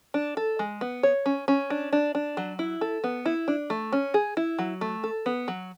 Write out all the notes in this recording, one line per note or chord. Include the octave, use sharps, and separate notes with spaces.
D4
A4
G#3
B3
C#5
C#4
C#4
D4
D4
D4
F#3
E4
A4
B3
E4
D4
A3
C#4
G#4
E4
F#3
A3
A4
B3
F#3